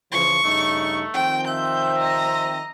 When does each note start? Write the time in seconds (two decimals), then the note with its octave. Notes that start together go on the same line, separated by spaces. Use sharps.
0.12 C#3 E3 F3 C#6
0.44 G2 C#3 A3 D#4
1.14 D#3 F3 C4 G5
1.47 E5 G6
1.99 D#5 A#5